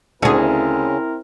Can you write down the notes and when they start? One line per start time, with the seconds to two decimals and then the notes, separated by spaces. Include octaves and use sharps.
0.22 D2 C#3 C4 C#4 E4 F#4 G#4 A#4